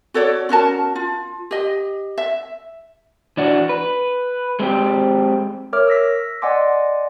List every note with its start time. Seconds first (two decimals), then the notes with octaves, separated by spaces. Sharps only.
0.14 F#4 A4 C#5 D5
0.49 C#4 F#4 A#4 A5
0.95 F4
1.51 G4 D#5
2.18 E5
3.37 E3 D4 F#4
3.69 B4
4.60 G#3 C4 G4
5.73 A#4 C#5 E5 D6 F6
5.88 E6 A#6 B6
6.42 D5 D#5 F#5 G#5 C6 D6